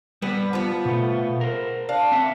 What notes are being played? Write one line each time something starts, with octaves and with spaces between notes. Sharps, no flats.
G3 B3 B4
F3 B3
B2 A3
A#4 C5
D4 F5
C4 E5 F#5